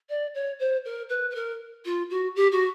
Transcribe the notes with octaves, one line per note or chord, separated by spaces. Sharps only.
D5
C#5
C5
A#4
B4
B4
A#4
F4
F#4
G4
F#4